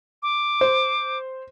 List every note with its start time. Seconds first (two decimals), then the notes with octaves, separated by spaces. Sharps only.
0.23 D6
0.61 C5